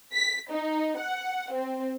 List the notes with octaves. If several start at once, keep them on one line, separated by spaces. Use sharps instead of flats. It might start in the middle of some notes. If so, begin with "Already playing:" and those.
B6
D#4
F#5
C4